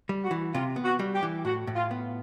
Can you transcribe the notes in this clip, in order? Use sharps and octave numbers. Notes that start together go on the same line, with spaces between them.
G3
F#4
E3
C3 F4
B3
F#4
G3
G4
E3
A2 F#4
A2
F4
B3